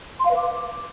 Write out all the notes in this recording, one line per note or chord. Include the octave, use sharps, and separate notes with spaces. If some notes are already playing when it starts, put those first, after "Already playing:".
C6
F5
B4
D6